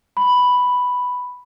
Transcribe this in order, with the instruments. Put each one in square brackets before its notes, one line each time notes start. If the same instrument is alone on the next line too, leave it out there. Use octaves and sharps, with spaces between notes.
[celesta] B5